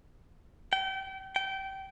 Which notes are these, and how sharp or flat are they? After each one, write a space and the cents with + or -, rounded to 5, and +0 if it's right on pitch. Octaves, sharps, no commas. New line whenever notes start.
G5 -30
G5 -20